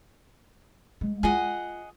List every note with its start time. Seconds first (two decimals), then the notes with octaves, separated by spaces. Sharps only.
1.01 G#3
1.23 F4 G#4 D#5 F#5